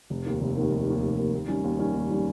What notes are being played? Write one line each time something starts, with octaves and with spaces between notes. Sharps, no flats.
F1
D#2 D#3 A#3
F1
D#2 D#3 A#3
F1
D#2 D#3 A#3
F1
D#2 D#3 A#3
D#2
D#3 G3 C#4
D#2
D#3 G3 C#4
D#2
D#3 G3 C#4